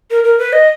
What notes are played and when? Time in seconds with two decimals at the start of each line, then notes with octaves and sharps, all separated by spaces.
0.11 A#4
0.24 A#4
0.39 B4
0.53 D#5